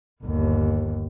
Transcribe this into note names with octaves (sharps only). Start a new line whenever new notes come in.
G1 D#2